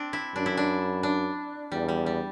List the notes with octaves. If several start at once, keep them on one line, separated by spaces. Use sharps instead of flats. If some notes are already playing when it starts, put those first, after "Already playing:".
Already playing: C4 D4
E4
F#2 D4
E4
D4
D4
E2 G3
G3
G3